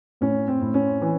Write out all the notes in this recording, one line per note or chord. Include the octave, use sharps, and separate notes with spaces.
A2 C#4
C4
A2
C#4
E3